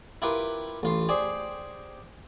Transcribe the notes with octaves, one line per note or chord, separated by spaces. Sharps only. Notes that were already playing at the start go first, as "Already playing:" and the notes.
E4 F4 G4 A#4 B4
A1 F4 C6
G4 G#4 C5 D5